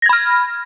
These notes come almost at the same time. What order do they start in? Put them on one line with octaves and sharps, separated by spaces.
A#6 G#6 B5 F6